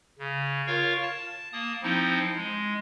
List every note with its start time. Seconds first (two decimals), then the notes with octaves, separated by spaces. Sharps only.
0.19 C#3
0.67 F4 A#4 C#5 F5 C#6
1.02 A5
1.53 A#3 A5 D#6
1.83 F3 C4 D#4 E4
2.36 G#3